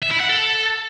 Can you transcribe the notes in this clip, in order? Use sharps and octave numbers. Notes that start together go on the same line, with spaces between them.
E5
E4
F#5
A4